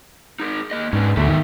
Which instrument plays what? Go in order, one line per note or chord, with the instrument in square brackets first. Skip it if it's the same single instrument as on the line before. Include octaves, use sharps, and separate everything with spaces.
[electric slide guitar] D#4 G#4 A#4
A#3 D#5
[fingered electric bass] G#2 [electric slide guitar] C#4 D4 B4
[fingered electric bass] D2 [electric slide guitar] B3 A4 E5
[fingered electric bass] D#3